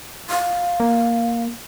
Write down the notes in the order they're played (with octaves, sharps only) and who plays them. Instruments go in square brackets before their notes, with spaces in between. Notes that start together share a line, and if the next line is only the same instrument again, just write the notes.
[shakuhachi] F5
[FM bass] A#3